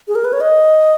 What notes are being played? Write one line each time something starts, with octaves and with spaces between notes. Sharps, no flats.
G#4
A#4
B4
C#5
D#5